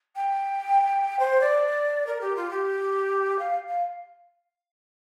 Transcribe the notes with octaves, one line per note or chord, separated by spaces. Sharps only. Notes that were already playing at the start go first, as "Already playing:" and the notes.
G5
C5
D5
A#4
G4
F4
G4
F5
F5